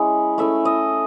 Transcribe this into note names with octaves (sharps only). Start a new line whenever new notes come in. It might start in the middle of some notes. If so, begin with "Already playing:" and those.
Already playing: G#3 C#4 E4
A3 C#4 E4 E5
D#5